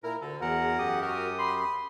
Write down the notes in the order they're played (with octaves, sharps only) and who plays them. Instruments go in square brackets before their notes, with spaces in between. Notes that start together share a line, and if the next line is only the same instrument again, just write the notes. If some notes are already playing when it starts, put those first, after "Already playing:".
[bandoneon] A#2 E4 [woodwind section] A#4
[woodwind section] D2 D3 [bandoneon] A4
[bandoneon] E2 A#4 [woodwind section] F#4 G#4 F#5
[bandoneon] F#2 G4 D#6
[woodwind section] F#4 A#4
B5 C6